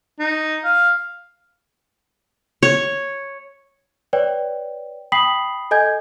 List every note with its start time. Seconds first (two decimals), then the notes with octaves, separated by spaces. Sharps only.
0.19 D#4
0.64 F5
2.63 C#5
4.13 B4 C#5 D5 G5
5.12 G5 B5 D#6 B6 C7 F#7
5.71 A4 D#5 G#5 G6 G#6